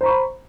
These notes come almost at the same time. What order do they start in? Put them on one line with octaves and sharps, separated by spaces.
C5 A#5 C#6 B5